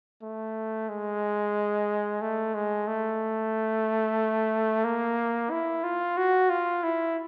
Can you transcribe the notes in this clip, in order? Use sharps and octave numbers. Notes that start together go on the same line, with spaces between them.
A3
G#3
A3
G#3
A3
A#3
E4
F4
F#4
F4
E4